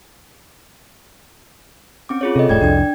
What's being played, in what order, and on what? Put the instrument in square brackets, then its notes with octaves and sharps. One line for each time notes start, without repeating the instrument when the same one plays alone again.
[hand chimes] C4 C#4 D6
F4 G#4 C#5
[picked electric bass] C3 [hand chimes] A4 D#5
[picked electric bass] F1 A2 [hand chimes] D5 G5 G#6
[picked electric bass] C2 F2 [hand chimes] D4 G5 G#6